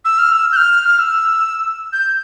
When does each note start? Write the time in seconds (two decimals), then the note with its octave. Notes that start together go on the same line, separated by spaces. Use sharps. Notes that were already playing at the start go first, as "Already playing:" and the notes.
0.05 E6
0.19 F6
0.32 E6
0.52 G6
0.56 F6
0.88 F6
0.99 E6
1.93 G6